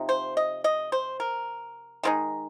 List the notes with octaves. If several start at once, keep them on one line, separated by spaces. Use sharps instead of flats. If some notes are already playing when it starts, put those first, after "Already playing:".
Already playing: C3 F3 D#4
C5
D#5
D#5
C5
A#4
D#3 G#3 C4 D#4